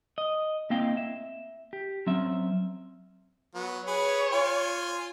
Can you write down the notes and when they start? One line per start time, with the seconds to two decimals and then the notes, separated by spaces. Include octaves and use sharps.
0.18 D#5
0.70 A#3 C4 E4 D#5 F5 G5
0.97 E5
1.73 G4
2.07 F#3 C4 C#4 E5
3.55 F#3 B3
3.87 G#4 B4 C#5
4.32 F4 G#5 C6